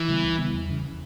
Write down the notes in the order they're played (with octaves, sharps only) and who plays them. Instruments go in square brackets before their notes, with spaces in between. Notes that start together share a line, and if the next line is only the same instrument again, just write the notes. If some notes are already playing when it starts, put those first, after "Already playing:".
Already playing: [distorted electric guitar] E3
[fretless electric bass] C#3 G3 B3
C#2
C#3 G3 B3
E2
C#3 E3